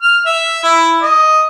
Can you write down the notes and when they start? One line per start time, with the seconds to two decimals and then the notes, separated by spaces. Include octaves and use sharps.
0.02 F6
0.26 E5
0.64 E4
1.02 D#5